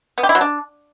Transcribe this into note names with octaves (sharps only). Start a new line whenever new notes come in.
B3
G4
E4
F#3
D4